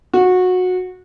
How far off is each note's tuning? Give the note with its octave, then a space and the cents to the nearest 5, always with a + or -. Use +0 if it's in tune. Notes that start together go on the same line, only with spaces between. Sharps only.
F#4 -20